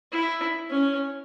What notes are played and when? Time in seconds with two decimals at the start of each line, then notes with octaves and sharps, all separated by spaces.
0.12 E4
0.70 C#4